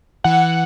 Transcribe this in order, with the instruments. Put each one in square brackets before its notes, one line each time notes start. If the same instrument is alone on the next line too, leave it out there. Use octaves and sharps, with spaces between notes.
[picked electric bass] E3 [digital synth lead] F#5